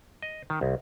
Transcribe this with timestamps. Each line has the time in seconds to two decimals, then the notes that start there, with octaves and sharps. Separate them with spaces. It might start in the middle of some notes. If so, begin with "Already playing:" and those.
0.22 D#5
0.50 D#3
0.61 C2